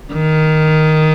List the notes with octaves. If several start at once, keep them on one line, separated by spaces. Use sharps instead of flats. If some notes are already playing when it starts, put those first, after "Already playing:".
D#3